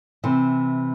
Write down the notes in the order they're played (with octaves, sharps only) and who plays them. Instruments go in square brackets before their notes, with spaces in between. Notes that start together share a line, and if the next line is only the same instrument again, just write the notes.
[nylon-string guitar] C3 E3